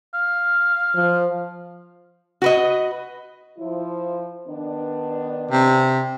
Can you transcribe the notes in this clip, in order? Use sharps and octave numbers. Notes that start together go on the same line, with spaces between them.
F5
F3
F#4 B4 D#5
F3 E4
D#3 B3 D4
C3